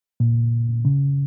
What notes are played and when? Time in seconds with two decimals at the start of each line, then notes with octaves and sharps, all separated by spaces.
0.20 A#2
0.85 C#3